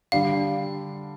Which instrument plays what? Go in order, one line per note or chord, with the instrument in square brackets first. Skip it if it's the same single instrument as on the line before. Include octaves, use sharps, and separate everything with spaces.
[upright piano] D3 G3 D4 [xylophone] F5